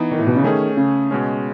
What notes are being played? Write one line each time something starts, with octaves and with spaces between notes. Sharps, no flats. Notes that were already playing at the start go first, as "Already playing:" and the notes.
Already playing: E3 B3 D#4
D#3
A2
B2
C#3
D#3 A3 C#4 G#4
C#3
B2 G#3 C#4